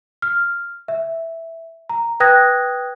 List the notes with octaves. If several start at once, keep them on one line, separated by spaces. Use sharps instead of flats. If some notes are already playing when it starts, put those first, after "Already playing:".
F6
E5
A#5
B4 G5 D#6 F#6 G#6 A#6